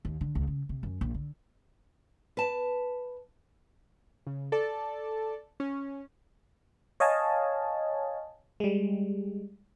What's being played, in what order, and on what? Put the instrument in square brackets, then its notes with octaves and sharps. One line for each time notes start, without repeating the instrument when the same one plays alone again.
[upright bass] D#2
D3
C#2
C#3
C3
F#2
A#1
D3
[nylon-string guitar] B4 A5
[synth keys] C#3
A4 D5 A5
C#4
[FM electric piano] C#5 D#5 F5 G#5 A5
G3 G#3